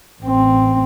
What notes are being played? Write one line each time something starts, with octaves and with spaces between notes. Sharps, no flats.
A1 C4